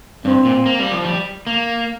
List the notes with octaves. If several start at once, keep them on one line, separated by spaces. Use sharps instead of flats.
G2 C4
A#2
A#3
G3
F3
G3
A#3